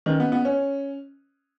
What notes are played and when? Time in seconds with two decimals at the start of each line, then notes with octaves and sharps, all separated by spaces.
0.06 D#3 C#4 B4 D#5
0.20 B3
0.32 B3
0.45 C#4